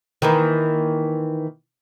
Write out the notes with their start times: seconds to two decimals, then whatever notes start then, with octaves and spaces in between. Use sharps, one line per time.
0.22 D#3 E3 A#3